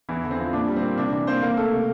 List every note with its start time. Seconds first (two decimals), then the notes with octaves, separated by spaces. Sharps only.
0.09 E2 E3 E4
0.24 D3
0.30 C4
0.39 F3
0.53 A#2 D4
0.68 G3
0.76 C4
0.82 A#3
0.98 C3 D4
1.13 E3 D4
1.27 A#3 C4 C5
1.42 A#3 A#4
1.57 A3 A#3 A4
1.72 C3